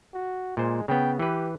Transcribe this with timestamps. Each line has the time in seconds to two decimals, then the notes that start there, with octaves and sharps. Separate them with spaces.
0.14 F#4
0.57 A#2 G#3 C5
0.88 C#3 B3 G5
1.19 E3 G4 B4